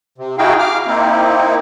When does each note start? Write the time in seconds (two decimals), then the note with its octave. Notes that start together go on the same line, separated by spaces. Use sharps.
0.18 C3
0.38 D#4 E4 F#4 G#4 F5 G5
0.59 F5 D6 F6
0.87 A#3 C4 D#4 E4